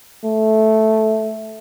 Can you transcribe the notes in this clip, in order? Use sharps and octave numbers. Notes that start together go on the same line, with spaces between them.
A3